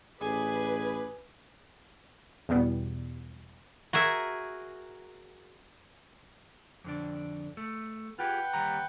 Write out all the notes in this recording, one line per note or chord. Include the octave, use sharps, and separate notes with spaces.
A1 G#4 B4 G#5 D6
E2 B2 G3 B3
F#4 G#4 A#4 E5
F2 D3 D4
A3
F4 G4 G#4 B4 F#5 G5
D#2 G3 A#5